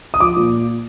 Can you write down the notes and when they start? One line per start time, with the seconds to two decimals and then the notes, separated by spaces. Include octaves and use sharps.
0.14 D#6
0.20 F3 D6
0.36 A#2